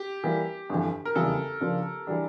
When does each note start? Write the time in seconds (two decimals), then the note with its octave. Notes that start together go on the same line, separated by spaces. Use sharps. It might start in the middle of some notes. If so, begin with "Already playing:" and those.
Already playing: G4
0.24 E3 G3 A#3
0.70 G1 F2 E3
1.05 A#4
1.15 F1 E2 C#3 E3 G3 A4
1.61 C#3 F3 A#3 D4
2.07 E3 G3 D4